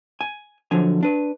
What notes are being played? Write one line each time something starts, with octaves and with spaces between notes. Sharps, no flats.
G#5
D3 F3 F#3 G#5
D4 B4